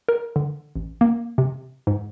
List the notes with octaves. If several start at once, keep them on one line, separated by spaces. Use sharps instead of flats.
A#4
D3
A1
A#3
C3
G#2